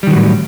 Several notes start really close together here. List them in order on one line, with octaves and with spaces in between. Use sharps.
G3 D#3 F#3 A2